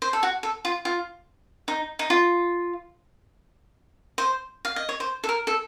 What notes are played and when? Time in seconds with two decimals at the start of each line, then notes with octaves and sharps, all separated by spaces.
0.02 C5
0.13 A4
0.23 F#4
0.43 A4
0.65 F4
0.85 F4
1.68 D#4
1.99 D#4
2.10 F4
4.18 C5
4.65 F5
4.76 D#5
4.89 C#5
5.00 C5
5.24 A4
5.29 A#4
5.47 A4